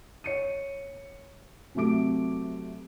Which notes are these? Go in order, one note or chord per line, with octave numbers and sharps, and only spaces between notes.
C#5 C#7 D#7
C3 F#3 A3 D6 D7